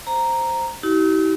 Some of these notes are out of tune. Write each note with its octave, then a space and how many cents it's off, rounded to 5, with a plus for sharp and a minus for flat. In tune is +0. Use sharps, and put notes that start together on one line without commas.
C5 +0 A#5 -5
E4 -45 G4 -40